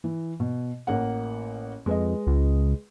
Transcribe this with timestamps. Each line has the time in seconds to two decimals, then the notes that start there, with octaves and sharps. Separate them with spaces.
0.04 E3
0.40 B2
0.87 A1 A#3 F#5
1.86 F2 G#3 B4 D#5
2.27 C#2